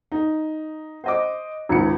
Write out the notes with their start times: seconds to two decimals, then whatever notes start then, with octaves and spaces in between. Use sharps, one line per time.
0.12 D#4
1.04 C5 D#5 D6
1.69 G#1 C#2 C#7